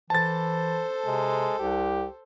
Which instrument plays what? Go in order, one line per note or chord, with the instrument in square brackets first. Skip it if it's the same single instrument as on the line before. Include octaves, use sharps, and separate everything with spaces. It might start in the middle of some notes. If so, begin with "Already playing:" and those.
[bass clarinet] E3 [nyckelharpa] A4 C5 [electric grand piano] A5 A6
[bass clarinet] C3 [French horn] G#3
[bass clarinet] C2 [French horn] G4